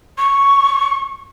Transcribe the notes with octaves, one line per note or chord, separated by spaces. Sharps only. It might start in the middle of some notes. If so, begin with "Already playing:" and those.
C#6